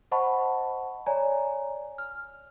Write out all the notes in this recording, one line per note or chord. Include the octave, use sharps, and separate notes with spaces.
C5 D#5 F#5 A5 B5 C#6
C#5 D5 G#5 A#5
F6